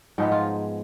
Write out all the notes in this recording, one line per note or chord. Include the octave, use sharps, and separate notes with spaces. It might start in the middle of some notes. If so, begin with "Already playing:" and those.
G#2 F3 G#3 B3 D#4
F4